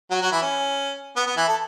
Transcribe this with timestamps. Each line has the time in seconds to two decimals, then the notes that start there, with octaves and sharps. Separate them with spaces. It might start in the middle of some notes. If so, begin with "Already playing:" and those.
0.10 F#3 F#4
0.21 F#3 F#4
0.31 E3 E4
0.42 C#4
1.16 B3
1.26 B3
1.37 E3 E4
1.48 A4